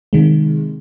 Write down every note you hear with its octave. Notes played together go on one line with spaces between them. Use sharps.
C3 D#3 G#3